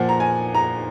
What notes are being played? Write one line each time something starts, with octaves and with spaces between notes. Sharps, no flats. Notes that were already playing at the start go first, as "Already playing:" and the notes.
Already playing: A#2 F3 F#5
A#5
G#5
A#5